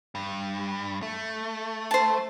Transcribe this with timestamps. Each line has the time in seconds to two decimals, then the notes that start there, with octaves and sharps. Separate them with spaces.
0.15 G2
1.02 A3
1.91 C5 A5